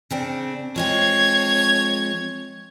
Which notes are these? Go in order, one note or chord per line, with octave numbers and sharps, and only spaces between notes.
C#3 C4 D4
F3 G#3 C4 C#5 G#6